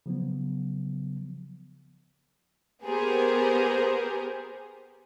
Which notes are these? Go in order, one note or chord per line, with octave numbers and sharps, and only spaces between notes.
C#3 F3 F#3 B3
B3 G4 G#4 A#4 C5